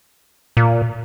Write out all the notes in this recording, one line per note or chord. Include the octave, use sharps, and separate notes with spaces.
A#2